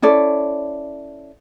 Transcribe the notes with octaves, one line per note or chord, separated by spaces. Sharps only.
C#4 E4 A4 D5